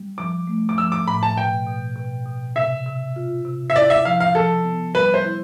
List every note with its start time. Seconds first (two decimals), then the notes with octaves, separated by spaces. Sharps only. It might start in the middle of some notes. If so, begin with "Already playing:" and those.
Already playing: G3
0.18 F3 D6
0.47 A3
0.69 D6
0.78 F3 E6
0.92 D6
1.07 A2 B5
1.23 A5
1.37 B2 G5
1.67 B2
1.96 B2
2.26 B2
2.56 C3 E5
2.86 C3
3.16 F4
3.45 C3
3.70 E5
3.75 E4 D5
3.90 E5
4.05 F3 F5
4.20 F5
4.35 F3 A4
4.64 B3
4.94 G3 B4
5.14 C5
5.24 E4